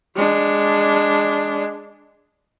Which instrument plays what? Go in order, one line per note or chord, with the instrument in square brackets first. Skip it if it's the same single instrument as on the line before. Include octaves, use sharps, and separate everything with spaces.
[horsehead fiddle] G#3 D4